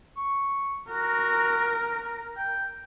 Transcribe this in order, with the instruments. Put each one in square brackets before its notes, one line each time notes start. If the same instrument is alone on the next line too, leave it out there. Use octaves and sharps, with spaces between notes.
[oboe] C#6
[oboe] F#4 [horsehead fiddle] A#4
[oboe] G5